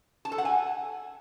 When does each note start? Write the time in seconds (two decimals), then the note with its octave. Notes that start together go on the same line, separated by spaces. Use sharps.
0.25 A5
0.32 A4
0.38 F#5
0.45 G#5